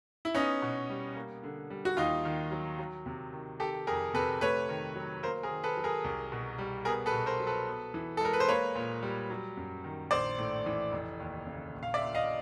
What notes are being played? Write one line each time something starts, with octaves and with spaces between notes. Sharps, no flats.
E4
B3 C#4 D#4
B2
G3
A#3
D3
G3
F#4
D#2 D#4 F4
D#3
F#3
F#3
C3
D#3
D#3 G4 A4
F2 G#4 A#4
C3 A4 B4
A3 B4 C#5
D#3
F#3
A#3 A#4 C5
G#4 A#4
D#3
A4 B4
F#3
G#4 A#4
C2
B2
G3
B3 G#4 A#4
A4 B4
B2
A#4 C5
F#3
A4 B4
B3
E3
A4
G#3 A#4
B4
C5
A#3 B4 C#5
A#2
G3
F#3
F#2
D#3
A#1 C5 D5
A2
E3
F1
D#2
C#3
A#1
F5
D5 E5
A#2
D#5 F5